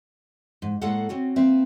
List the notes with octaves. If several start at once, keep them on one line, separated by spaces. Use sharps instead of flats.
G#2
A2 G#3 A#3 G#4 A4 F#5
C4 C#4 F#4
A#3 C4 B4 E5